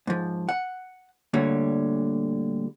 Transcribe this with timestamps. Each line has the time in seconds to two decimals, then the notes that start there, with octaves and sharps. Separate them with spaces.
0.07 G#2 F3
0.49 F#5
1.34 D2 A#2 D3 G3 C#5